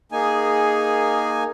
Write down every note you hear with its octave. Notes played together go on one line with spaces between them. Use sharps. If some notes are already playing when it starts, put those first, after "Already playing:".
A#3 D#4 G#4 G#5